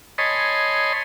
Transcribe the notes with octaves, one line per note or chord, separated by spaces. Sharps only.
C#5 D#5 G#5 A5 B5 C6